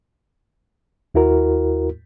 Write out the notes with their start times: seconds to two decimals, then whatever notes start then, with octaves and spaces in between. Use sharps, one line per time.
1.15 D#2 E4 F#4 A#4